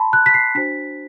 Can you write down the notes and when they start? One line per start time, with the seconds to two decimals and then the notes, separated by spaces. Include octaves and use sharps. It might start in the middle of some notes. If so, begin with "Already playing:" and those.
Already playing: A5 B5 C6
0.13 F#6
0.26 B6
0.34 C7
0.55 D4 F#4 C5 B6